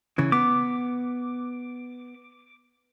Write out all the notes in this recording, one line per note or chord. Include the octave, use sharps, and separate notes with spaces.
C#3 E3
B3 D6